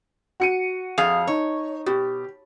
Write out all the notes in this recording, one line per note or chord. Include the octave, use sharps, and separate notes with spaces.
F#4 C#7 D#7
F2 G#4 F5
D#4 C#5
B2 G4